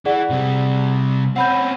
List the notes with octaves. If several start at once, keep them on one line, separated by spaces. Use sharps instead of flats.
E3 G#4 D5 F#5
C3 G3
C4 C#4 F#5 B5 G6